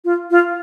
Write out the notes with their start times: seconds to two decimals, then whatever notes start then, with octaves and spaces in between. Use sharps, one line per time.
0.05 F4
0.31 F4